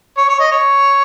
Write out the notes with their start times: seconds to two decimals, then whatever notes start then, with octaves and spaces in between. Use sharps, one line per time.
0.17 C#5
0.29 C#5
0.40 D#5
0.51 C#5